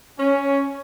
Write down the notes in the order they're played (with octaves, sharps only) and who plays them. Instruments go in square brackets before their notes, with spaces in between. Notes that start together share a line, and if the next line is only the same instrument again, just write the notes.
[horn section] C#4